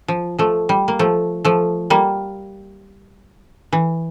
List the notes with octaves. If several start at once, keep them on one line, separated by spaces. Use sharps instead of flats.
F3
F3 A3
G3
A#3
F3 A3
F3 A3
G3 A#3
E3